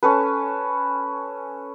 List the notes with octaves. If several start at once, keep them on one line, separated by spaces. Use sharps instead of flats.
C#4 A4 B4